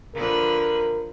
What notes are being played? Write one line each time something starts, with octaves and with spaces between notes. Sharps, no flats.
D3 F3 A#4 B4